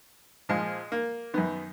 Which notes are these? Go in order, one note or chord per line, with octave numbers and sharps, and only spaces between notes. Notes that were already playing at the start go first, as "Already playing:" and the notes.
A#2 F3 G#3
A#3
F#2 D#3 B3